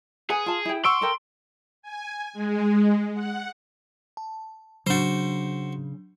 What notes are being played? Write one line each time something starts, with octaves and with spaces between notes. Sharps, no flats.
G#4 B4 F#5 G#5
F4 A5
E4 G5
F#5 C6 C#6 E6 D7
A4 A#4 G5
G#5
G#3
F#5
A5
C#3 F#3 D4 F#4 C5